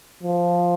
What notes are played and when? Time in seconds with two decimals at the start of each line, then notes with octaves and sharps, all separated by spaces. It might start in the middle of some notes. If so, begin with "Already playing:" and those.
0.23 F3